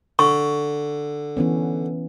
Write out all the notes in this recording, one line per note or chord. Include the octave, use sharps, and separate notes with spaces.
D3 C#6
E3 B3 C#4